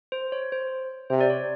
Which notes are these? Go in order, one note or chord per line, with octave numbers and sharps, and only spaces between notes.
C5
C#5
C5
C3 C5
D5
C#5